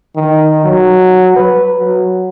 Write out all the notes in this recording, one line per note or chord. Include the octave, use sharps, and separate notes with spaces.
D#3
F#3
B4
F#3